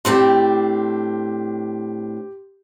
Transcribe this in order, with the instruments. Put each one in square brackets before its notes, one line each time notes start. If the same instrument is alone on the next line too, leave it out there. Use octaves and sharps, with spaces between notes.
[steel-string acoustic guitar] A2 C4 D4 [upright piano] G4 C6